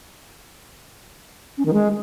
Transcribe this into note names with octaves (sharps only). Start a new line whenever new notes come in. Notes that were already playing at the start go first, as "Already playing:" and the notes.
C#4
D#3
G#3